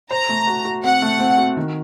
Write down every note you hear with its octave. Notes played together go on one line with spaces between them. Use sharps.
C5 A#5
A3
F#4
F#4
C4 F#5
A3
C4
F#4
D#3